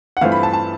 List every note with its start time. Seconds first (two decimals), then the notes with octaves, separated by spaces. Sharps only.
0.17 F#5
0.21 G2 E3 A3 C4 F4 F5
0.32 B5
0.43 A5
0.53 A5